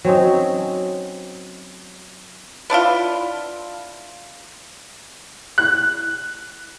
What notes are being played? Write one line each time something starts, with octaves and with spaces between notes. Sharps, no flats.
F#3 C4 C#4 D#4
B3 D4 E4 F4
F#6